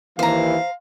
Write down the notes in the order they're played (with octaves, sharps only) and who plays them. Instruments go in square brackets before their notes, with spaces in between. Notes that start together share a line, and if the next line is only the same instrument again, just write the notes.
[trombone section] D#2 E3 [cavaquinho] C5 A#5 [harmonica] F5